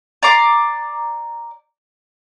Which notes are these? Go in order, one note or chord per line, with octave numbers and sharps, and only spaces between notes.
D5 A#5 C6 D6